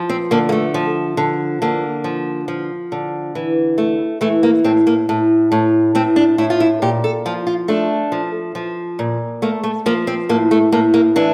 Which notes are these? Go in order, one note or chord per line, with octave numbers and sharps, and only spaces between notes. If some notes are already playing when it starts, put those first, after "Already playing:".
Already playing: F3
C4
D3 A#3
A#3
A3
F3
D3
D3 A#3
F3
F3
D3
E3
A3
E3 A3
A#3
A2 C4
A#3
A2
A2
A2 C4
D4
A2 E4
F4
E4
A#2 G4
A4
F3 F4
F4
A3 D4
F3
F3
A#2
A3 A#3
A3
F3 A#3
C4
A2 A#3
A3
A2 A#3
A#3
E3 D4